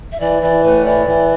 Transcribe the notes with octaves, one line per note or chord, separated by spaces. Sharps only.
E5
E3 D5
E3 D5
A2 B4
E3 D5
E3